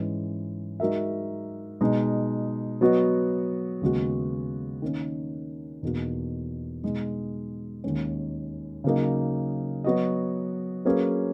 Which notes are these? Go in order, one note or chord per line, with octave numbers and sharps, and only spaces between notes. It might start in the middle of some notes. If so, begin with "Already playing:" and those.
Already playing: G#2 E3 G#3 C#4
G#3 D#4 F#4 A#4 E5
B2 G#3 D#4
F#3 B3 F#4 B4 D#5
D#2 C#3 G#3 B3 F#4
D#3 A#3 C#4
E2 B2 A#3 D#4 F#4
B2 G#3 D#4
D#2 D#3 G#3 C#4
C#3 F#3 A#3 D#4
F#3 B3 F#4 B4 D#5
F#3 A#3 C#4 G#4 B4